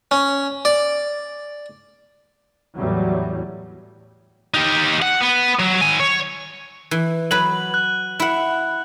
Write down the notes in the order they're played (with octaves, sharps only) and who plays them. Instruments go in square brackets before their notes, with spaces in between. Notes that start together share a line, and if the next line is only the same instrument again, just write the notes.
[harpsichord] C#4
D5
[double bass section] E2 A2 F#3 G3
[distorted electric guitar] D#4 G4
F#5
B3
F#3
D#3 G#5
C#5
[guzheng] E3
[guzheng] F#3 B4 [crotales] F#7
[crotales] F#6
[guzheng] E4 F#5